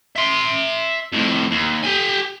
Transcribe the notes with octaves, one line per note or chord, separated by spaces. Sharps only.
E5 C6
F2 A2
D#2
G4 G#5